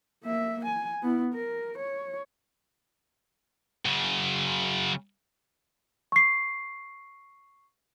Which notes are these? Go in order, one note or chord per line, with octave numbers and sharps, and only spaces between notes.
A#3 E5
G#5
B3 E4
A#4
C#5
F#2 C#3
C#6 C7